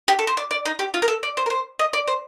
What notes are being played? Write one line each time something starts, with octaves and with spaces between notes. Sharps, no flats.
G4
A4
C5
D5
D5
D#4
G4
F4
A#4
A4
D5
C5
A#4
C5
D#5
D5
C5